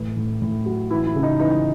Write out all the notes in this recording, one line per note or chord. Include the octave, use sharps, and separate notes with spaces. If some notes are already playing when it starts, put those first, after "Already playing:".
Already playing: A2 E3
A2
A2
F#3
E3 E4
E4
C#3
D#4
E3 D#4